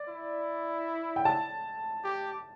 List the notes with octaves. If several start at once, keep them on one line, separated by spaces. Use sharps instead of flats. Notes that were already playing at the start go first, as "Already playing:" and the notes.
Already playing: D5
E4
G5
A5
G4